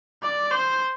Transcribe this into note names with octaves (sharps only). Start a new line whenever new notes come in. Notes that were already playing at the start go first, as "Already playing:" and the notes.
D5
C5